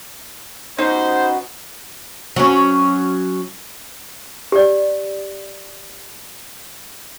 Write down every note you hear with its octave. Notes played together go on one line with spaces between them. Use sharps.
B2 C#4 D#4 C5
B3
F#3 C#4
G4 D5